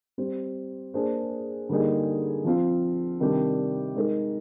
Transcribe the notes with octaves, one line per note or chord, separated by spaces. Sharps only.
G3 C4 G4 C5
A#3 D4 G#4 C5
D3 G3 A#3 D#4 G#4
F3 C4 F4
C3 D#3 G3 D4 G4
G#3 D#4 A#4